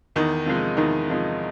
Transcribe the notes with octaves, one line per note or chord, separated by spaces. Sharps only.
E2 D#3 D#4
C3 F3 G#3
E2 D#3 D#4
C3 F3 G#3